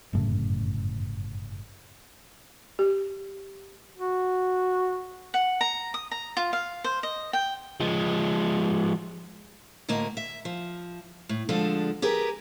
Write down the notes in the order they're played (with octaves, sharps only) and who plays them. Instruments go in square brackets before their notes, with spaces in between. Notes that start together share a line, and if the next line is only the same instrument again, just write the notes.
[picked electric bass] G1 F#2 A2 C#3
[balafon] G4
[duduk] F#4
[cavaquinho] F#5
A#5
D#6
A#5
F4
F5
C5
D#5
G5
[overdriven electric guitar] F3 G#3
[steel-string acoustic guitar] D2 A2 D3 A#3 D#5
E5
F3
A2
D3 F3 G#3 D4 A4
G4 G#4 A#4 B4